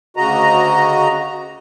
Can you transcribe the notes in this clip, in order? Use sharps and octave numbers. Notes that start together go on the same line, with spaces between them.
D2 C#3 F#4 D#5 A#5